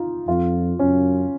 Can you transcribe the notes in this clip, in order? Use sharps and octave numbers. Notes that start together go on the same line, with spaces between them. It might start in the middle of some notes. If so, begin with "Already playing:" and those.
Already playing: D#4 F4
F2 F4
F#2 C#4